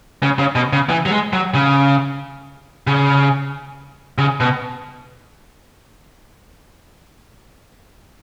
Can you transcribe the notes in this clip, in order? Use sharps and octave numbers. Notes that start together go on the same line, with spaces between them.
C#3
C#3
B2
C#3
E3
F#3
G#3
F#3
C#3
C#3
C#3
B2